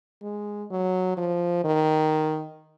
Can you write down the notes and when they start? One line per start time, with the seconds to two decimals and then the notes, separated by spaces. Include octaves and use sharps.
0.22 G#3
0.70 F#3
1.17 F3
1.64 D#3